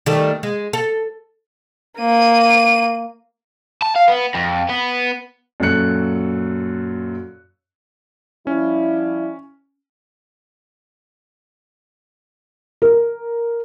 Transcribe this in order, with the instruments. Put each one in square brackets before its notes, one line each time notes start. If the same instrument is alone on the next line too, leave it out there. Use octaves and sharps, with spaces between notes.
[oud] D#3 G3 A3
G#3
A4
[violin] A#3 D#7
[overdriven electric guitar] A5
F5
B3
F2
B3
[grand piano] F#2 A#2 F#3 A4 F#6 C#7
[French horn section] F3 G3 E4 [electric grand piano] C#4
[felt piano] A#4